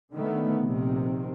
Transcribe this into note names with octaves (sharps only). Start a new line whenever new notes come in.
D3 D#3 A3 B3
A#1 C3 D#3